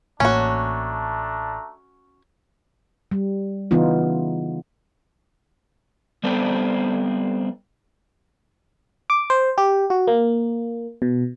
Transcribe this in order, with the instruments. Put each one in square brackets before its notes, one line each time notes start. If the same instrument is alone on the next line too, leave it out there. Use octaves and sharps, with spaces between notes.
[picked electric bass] A1 A2 A#3 [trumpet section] A3 D4 A#5 [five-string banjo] C#4 F#4
[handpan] G3
C#3 E3 B3 D#4 F4
[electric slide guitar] G3 B3 C4 D4 A4 C5
[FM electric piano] D6
C5
G4
F#4
A#3
B2